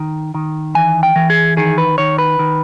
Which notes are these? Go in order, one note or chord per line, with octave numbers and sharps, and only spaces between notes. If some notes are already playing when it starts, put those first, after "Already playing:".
Already playing: D#3
D#3
E3 G#5
G5
E3
G#4
D#3 G#4
B4
D#3 C#5
B4
D#3